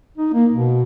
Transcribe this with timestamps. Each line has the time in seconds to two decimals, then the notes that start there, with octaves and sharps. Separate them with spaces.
0.18 D#4
0.33 A#3
0.52 B2